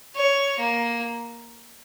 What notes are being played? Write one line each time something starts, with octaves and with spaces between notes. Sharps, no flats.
C#5
A#3